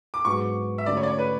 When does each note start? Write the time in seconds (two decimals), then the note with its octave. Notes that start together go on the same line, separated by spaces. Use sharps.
0.14 D6
0.25 G#2 F#3 B3 D4 G#4 C#6
0.78 E5
0.86 D3 A3 C#4 F#4 A4 D5
0.97 C#5
1.03 D5
1.08 C#5
1.19 B4